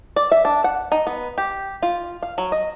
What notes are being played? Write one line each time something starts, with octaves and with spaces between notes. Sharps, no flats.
D5
E5
D4
F#5
D#4
B3
G4
F4
F5
F#3
D#5